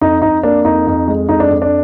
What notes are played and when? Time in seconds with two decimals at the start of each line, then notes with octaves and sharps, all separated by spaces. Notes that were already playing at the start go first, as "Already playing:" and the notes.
0.01 F2 D#4
0.22 F2 D#4
0.43 A#3 D4
0.65 F2 D#4
0.87 F2
1.08 G#3
1.29 F2 D#4
1.40 D4
1.50 F2
1.62 D4